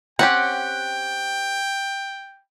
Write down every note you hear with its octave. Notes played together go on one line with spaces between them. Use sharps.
C4 C#4 G4 F#5 G5